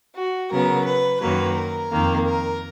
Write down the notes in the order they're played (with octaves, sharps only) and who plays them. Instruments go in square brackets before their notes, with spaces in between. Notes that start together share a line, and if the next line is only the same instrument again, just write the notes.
[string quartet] F#4
C#3 F#3 B3 A#4
B4
F#2 D#3 F#3 A#3 B4
A#4
F2 D#3 A#3
A#4